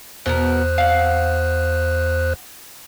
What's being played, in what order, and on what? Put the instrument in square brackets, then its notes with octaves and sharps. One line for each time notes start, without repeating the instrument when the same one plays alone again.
[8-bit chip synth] E2 C5 F#6 [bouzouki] B2 B3 A#4
[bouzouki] F5 F#5